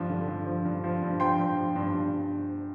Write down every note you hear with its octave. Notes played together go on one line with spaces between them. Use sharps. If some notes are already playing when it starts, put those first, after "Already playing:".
Already playing: G2 F3
D3
G2
F3
G2
F3
G2
F3 G5 C6
G2
F3
G2
G2